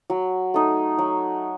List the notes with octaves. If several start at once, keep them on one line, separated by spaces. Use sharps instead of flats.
F#3
A3 D#4
F#3